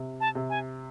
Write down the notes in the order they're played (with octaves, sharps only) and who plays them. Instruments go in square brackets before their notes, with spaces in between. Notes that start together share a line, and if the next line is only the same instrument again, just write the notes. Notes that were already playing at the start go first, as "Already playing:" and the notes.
Already playing: [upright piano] C3
[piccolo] A5
[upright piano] C3
[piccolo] G#5